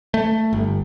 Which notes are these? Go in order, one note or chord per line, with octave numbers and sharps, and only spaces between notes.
A3
G1